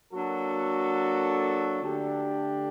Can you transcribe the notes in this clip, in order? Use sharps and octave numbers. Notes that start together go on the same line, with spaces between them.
F#3 A#3 D4 F#4 A4
D3 A3 D4 G4